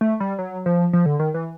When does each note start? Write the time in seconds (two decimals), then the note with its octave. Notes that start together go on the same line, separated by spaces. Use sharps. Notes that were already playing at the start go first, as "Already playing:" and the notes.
0.01 A3
0.20 G3
0.39 F#3
0.66 F3
0.93 F3
1.06 D3
1.19 D#3
1.34 E3